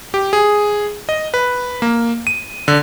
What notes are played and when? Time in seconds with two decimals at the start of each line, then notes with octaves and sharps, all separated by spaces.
0.14 G4
0.33 G#4
1.09 D#5
1.34 B4
1.82 A#3
2.27 D#7
2.68 D3